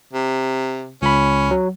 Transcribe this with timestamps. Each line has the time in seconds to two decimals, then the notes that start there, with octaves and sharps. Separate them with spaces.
0.13 C3
1.02 C#2 C#4 B5
1.51 F#3